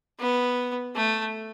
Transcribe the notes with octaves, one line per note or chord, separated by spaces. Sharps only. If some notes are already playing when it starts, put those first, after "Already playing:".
B3
A3